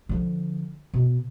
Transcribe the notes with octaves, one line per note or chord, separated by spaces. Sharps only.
D3 F3
B2